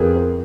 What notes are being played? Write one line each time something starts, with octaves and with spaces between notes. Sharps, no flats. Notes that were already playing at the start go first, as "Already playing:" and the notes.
Already playing: F2 G#4 A#4 B4
A#4 C5